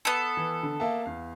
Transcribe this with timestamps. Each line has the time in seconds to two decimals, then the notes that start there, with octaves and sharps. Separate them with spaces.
0.05 B3 A4
0.37 E3
0.63 D3
0.80 A#3 E5 A5
1.06 E2 F5